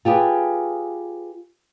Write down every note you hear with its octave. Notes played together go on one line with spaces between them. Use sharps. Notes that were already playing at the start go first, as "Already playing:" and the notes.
F4 G4 G#4 B4